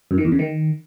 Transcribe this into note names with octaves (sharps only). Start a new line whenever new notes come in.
F#2
D#3
E2
C#3
D#3